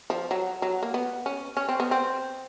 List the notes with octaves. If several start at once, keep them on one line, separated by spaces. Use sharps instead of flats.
F3
F#3
F#3
A#3
B3
C#4
C#4
C4
B3
C4